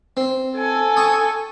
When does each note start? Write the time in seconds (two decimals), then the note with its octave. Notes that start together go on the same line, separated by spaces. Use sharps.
0.17 C4
0.56 A4 G#5
0.97 G5 C#6 D#6